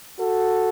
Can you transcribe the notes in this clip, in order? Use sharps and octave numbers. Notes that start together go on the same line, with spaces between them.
F#4 A4